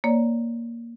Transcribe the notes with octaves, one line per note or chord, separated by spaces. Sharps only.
A#3 C#5 D5